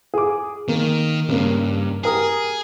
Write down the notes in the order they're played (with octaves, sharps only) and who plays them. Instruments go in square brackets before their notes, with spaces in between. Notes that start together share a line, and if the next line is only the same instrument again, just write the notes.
[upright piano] G#4 D6
[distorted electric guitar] D#3 [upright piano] A#3
[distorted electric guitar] B1 G2 [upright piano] C#3 A#3
[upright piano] G4 A#4 D#6 [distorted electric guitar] G#4